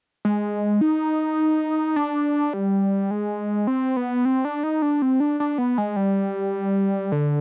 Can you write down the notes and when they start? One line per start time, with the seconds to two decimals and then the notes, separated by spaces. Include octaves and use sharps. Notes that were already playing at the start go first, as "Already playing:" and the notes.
0.25 G#3
0.81 D#4
1.96 D4
2.54 G3
3.11 G#3
3.67 C4
3.97 B3
4.25 C4
4.45 D4
4.63 D#4
4.82 D4
5.02 C4
5.20 D4
5.40 D4
5.58 B3
5.78 G#3
5.96 G3
7.12 D3